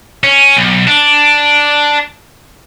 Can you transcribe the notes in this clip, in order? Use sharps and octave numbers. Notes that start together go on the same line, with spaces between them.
C#4
B1
D4